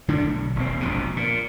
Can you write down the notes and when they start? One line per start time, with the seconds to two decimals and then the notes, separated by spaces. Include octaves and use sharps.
0.08 D3 D#3 A3 D4
0.23 B1
0.56 D#1 C4
0.80 E1 A#1 B2
1.16 A#2